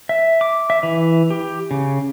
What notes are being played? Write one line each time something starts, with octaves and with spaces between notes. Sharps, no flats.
E5
D6
E5
E3
G4
C#3